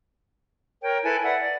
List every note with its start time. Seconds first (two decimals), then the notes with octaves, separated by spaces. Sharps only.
0.82 A#4 C#5 G5
1.04 E4 A4 B4 G#5
1.24 B4 D5 E5 F#5
1.40 D5